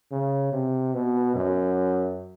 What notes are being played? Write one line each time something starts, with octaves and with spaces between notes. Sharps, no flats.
C#3
C3
B2
F#2